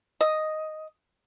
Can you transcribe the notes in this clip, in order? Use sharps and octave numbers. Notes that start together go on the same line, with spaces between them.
D#5